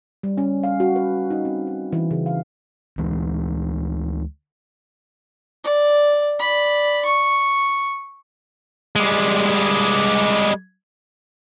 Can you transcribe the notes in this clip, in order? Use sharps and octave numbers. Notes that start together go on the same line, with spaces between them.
G3
C#4
F5
F#4
B4
D#4
C4
D#4
E3
C#3
F5
D2 E3 G#3
D5
D5 B5
C#6
G3 G#3